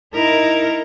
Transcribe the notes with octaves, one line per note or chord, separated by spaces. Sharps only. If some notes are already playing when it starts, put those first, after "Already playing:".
D#4 E4 A#4